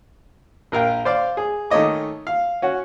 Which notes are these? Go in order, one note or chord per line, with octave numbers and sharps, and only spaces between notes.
A#1 A#4 F5 G5
C5 D5 F5
G#4
D#3 A3 C#4 C#5 D#5 D6
F5
C#4 F#4